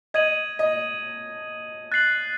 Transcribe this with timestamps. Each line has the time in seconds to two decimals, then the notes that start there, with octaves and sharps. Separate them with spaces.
0.14 D#5 G#6 D#7 F#7
0.59 D#5
1.92 F#6 A6 C7 F#7